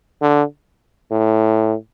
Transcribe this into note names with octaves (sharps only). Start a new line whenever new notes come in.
D3
A2